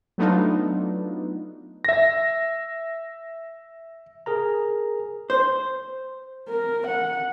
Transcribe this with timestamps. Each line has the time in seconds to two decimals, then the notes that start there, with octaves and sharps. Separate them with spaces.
0.18 F#3 A3 B3 D4 D#4 F4
1.85 E5 A#6
4.26 G#4 A#4 A#5
5.30 C5
6.49 A#4
6.87 F#5